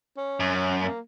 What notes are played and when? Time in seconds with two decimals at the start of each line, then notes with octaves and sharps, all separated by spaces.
0.17 C#4
0.40 F#2
0.54 C#4
0.82 A#3